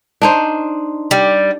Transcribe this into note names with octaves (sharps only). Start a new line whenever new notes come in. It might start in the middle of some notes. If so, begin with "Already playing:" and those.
D4 D#4 C5
G3